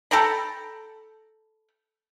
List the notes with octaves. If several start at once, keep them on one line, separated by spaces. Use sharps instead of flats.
A4 G5 A#5 B5